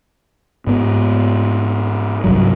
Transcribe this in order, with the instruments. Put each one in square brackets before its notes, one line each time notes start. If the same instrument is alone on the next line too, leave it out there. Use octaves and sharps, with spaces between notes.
[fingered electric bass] G#2 B3
C2 G2 F#3